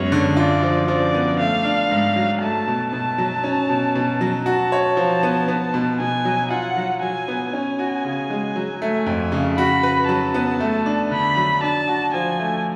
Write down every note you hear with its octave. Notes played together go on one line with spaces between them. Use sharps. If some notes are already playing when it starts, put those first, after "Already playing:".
Already playing: F#2 G#3 B3 C#5
D3
F4 D5
F3
F3 D5
B3
A3 F5
D4
G#2
F#3
A3 A5
B2
B2 A5
F#3
C#4
B2
B2
F#3
F#4 A5
C#5
F3
B3
B3
B2
B2 G#5
F#3
F4 F#5
F#3
F#3 G#5
B3
C#4 G#5
F#4
C#3
G#3
F#3
A3
F2
C#3
F#4 B5
B4
F#3 A5
B3
A3
D4
D3 B5
F#3
D4 A5
F#4
F3 G#5
A3